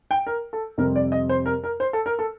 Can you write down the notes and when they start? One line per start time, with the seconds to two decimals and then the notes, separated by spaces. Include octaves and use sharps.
0.11 G5
0.27 A#4
0.53 A4
0.78 F2 C3 G3 C4 A#4
0.96 D5
1.12 D#5
1.29 C5
1.46 A#4
1.64 A#4
1.80 C5
1.93 A4
2.06 A#4
2.19 A4